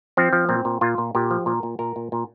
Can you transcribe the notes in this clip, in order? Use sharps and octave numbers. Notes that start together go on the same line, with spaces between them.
F3 C4
F3
A#2 C4
A#2
A#2 F4
A#2
A#2 G4
F3
A#2 A#4
A#2
A#2 A#4
A#2
A#2